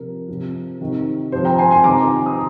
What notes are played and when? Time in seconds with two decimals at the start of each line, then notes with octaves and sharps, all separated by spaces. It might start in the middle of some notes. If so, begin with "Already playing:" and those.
Already playing: C3 F3 A#4
0.28 C3 F3
0.81 C3 D#3
1.32 C3 F3 C5
1.45 G5 A#5
1.58 G#5 C6
1.71 G#5 C6
1.84 C3 D#3 A#5 D6
2.26 D#6